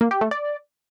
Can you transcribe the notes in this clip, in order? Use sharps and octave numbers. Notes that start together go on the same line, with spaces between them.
A#3
G4
A3
D5